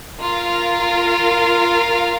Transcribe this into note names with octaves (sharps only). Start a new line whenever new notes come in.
F4 A#4 F5